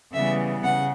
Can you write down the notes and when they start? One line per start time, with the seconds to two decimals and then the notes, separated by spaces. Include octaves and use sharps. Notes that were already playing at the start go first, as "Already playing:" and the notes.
0.13 C#3 E3 G3 B3 E5
0.64 C#3 F#5